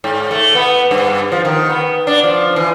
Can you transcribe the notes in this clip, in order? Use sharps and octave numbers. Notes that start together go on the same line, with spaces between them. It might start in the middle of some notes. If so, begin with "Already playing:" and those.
G#2
A3
B3
G2
F3
D#3
B3
D4
F3
E3